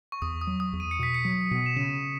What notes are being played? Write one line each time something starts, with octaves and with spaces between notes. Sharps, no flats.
C#6
E2 D#6
D#6
F#3
D#6
E2
D#7
C#7
B2 B6
C#7
F#3
B2
E7
C#3 D#7